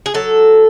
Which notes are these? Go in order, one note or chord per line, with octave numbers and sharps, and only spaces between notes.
G#4
F#3 A4